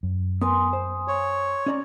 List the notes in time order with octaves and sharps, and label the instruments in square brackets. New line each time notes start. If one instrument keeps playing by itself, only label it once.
[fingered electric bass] F#2
[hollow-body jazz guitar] B3 A#4 B4 [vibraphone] G#5 C6 D#6
[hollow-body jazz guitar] C5
[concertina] C#5
[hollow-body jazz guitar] C#4 D5 A#5